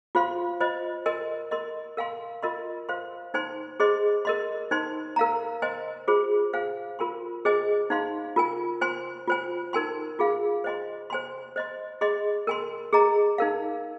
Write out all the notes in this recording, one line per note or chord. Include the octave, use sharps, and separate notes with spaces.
F4 C5 F5 C6
F4 C5 D#5
A#4 D#5 G#5 C6
A#4 D#5 C6
A#4 F5 G#5 C6
F4 A#4 D#5 C6
C5 F5 C6
D#4 C5 G#5 C6
G#4 C5 D#5 C6
A#4 D#5 C6
D#4 C5 G#5 C6
A#4 F5 A#5
C5 D#5 G#5 C6
F4 G#4 C5
C5 F5 G#5
F4 A#4 G#5 C6
G#4 C5 D#5 G#5
D#4 C5 F5 C6
F4 A#4 G#5
C5 G#5 C6
F4 C5 G#5
D#4 A#4 G#5 C6
F4 G#4 F5
C5 D#5 G#5 C6
C5 G#5 C6
C5 D#5 C6
G#4 D#5 C6
A#4 G#5 C6
G#4 D#5 A#5
D#4 A#4 F5